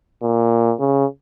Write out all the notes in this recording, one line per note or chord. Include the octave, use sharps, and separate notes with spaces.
A#2
C#3